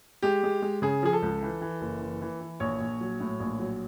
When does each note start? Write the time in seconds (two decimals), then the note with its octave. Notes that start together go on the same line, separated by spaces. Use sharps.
0.23 G#3 G4
0.43 G#3
0.62 G#3
0.82 C#3 G#4
1.03 F3 G#4
1.13 A4
1.22 C#2
1.42 E3
1.61 E3
1.81 F#1
2.02 E3
2.22 E3
2.41 E3
2.60 A#1 C#5
2.80 A#1
3.01 F#3
3.20 A2
3.40 A#1
3.59 F#3